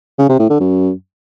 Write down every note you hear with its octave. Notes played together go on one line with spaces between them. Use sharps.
C#3
C3
A2
D3
F#2